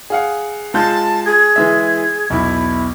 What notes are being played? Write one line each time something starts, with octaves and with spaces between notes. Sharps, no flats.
G#4 F5 F#5
G#3 F4 A5 G6
G#4
E3 G#3 E5
B1 E2 E4